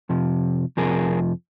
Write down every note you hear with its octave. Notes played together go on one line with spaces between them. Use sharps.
F2 C3 F3
F2 C3 F3 G#4 A#4